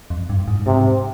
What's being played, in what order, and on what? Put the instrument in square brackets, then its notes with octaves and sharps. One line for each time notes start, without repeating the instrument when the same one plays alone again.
[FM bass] F2
G2
G#2
[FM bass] G#2 [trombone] C3